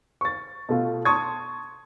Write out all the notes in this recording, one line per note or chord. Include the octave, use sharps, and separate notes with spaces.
C#6 A6
B2 A3 F4
A5 C6 C#6 D#6 G#6